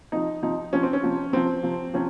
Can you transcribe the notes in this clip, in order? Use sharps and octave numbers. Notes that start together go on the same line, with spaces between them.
C3 F3 D#4
C3 F3 D#4
C3 F3 C#4
C4
C#4
C3 F3
C3 F3 C4
C3 F3
C3 F3 C#4